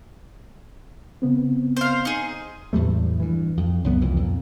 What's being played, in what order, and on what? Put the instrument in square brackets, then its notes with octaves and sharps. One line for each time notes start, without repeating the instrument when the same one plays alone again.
[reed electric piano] C#3 B3 C4
[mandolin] C5 F5
D#4 G#4
[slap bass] E2 A2 G3 A3
G2 E3
F2
C#2 F#2 B3
C2 F2 E3
F2 A#2